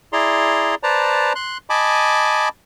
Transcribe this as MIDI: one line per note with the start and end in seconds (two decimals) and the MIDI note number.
0.13 0.75 64
0.13 0.75 68
0.13 0.75 74
0.13 0.75 82
0.13 0.75 84
0.83 1.33 71
0.83 1.33 72
0.83 1.33 74
0.83 1.33 81
0.83 1.33 82
1.35 1.58 84
1.35 1.58 90
1.70 2.49 75
1.70 2.49 80
1.70 2.49 81
1.70 2.49 83
1.70 2.49 86